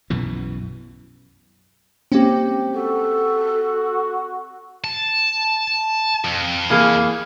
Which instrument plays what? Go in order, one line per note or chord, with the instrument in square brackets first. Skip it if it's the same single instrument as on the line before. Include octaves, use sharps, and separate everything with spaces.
[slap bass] B1 F#2 B2 E3
[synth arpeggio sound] G#3 A#3 C#4 [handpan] C4 G4
[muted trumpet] F#4 [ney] A4
[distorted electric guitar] A5
F2
[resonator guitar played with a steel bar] E3 A#3 G#4